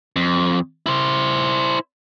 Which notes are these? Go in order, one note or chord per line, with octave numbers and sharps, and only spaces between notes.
F2
E4 C5